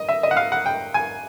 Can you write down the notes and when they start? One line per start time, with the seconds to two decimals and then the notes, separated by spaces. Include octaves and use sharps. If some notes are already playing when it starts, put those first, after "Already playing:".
Already playing: D#5
0.09 E5
0.23 D#5
0.31 F#5
0.37 F5
0.52 F#5
0.66 G5
0.94 G#5